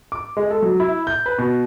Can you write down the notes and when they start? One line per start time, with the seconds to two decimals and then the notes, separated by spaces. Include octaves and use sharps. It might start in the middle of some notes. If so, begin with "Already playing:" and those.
0.12 D6
0.37 G#3
0.51 A4
0.62 F#3
0.80 E4
1.07 G6
1.26 B4
1.39 B2